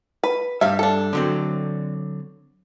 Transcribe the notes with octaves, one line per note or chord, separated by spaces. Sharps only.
B4
G2 G3 E5 F5
D4 A4
D3 F#3 C4